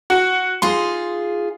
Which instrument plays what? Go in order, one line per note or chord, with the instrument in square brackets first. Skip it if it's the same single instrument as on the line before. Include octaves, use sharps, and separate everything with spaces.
[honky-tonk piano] F#4
[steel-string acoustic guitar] D#4 F4 G#4 [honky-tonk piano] C6